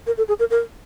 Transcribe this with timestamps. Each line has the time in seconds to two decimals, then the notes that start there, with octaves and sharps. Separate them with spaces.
0.07 A#4
0.18 A4
0.28 G#4
0.39 A#4
0.50 A#4